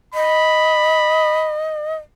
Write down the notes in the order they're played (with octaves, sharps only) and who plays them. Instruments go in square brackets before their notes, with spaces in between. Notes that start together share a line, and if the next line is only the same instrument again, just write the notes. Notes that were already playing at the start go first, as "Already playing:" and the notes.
[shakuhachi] D#5 [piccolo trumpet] B5